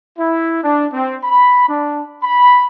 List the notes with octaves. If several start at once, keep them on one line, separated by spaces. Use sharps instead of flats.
E4
D4
C4
B5
D4
B5